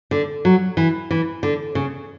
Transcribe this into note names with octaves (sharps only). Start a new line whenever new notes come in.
D3
F#3
E3
E3
D3
C#3